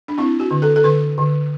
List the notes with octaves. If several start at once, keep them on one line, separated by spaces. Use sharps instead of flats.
D4
C4 E4
F#4
D3
A4
A4
D3 B4
D3